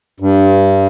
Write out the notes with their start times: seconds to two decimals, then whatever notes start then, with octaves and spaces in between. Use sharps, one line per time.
0.20 G2